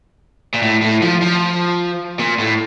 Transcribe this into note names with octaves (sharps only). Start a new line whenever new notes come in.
A#2
A2
A2
F3
F3
A#2
A2